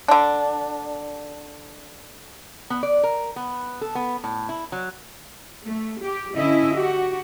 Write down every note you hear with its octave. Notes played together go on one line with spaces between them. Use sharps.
D3 D4
B3
D5
A#4
B3
A4
B3
A2
E4
F#3
A3
G4
D3 C#4 E4 D#5 E5
F#4 G4